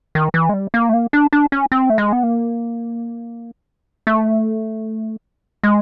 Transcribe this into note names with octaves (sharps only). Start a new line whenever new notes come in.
D#3
E3
G#3
G3
A#3
A3
A#3
D4
D4
C#4
C4
A3
G#3
B3
A#3
A3
G#3